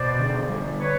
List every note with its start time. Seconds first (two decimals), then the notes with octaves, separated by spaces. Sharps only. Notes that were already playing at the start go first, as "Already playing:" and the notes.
Already playing: B2 C5 D5
0.19 D3
0.49 G3
0.80 B4 C#5